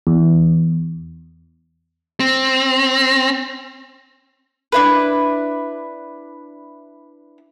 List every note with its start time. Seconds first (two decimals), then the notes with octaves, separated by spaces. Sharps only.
0.07 E2
2.20 C4
4.72 D4 E4 B4